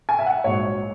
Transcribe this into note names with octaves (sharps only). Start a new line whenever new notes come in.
G#5
E5
F#5
A#1 G#2 F#3 C#5